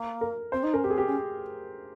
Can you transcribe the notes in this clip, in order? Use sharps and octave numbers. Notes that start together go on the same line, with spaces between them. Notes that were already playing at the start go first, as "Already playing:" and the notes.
Already playing: A#3
A#4
C4 C5
D#4
C#4 A#4
C4 G4
G#4
G4
C#4